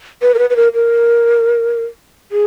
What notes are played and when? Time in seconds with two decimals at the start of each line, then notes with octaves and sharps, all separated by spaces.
0.22 B4
0.34 A#4
0.39 B4
0.50 B4
0.56 A#4
0.74 A#4
2.32 G#4